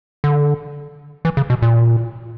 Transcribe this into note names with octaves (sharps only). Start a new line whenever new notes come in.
D3
E3
C#3
B2
A#2